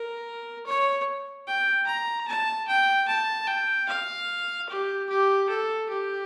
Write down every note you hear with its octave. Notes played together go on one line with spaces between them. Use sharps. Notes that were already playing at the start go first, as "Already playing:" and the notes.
Already playing: A#4
C#5
G5
A#5
A5
G5
A5
G5
F5
G4
G4
A4
G4